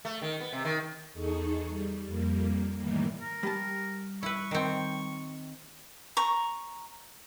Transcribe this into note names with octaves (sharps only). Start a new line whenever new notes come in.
A3
D#3
B3
C3
D#3
E2 D#4 G#4 A4 C#6
G3
F2 G3 A#3
A2 D#3 E3 G3 A#3
A#4
G3 A5
E4 B4 C#6
D#3 C4
A#5 C#6